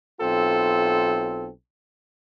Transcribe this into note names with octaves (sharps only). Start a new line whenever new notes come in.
B1 C4 F4 A4